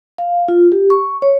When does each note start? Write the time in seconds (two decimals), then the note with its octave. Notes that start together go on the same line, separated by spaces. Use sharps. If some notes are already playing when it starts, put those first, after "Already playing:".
0.18 F5
0.48 F4
0.72 G4
0.90 C#6
1.22 C#5